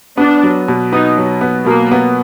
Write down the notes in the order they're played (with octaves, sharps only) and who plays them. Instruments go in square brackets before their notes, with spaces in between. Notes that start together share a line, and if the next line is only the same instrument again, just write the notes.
[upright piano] B3 [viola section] D4
[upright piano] F#3
B2
[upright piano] B3 [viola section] D#4
[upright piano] F#3
B3
[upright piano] B2 [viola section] A#3
[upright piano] B3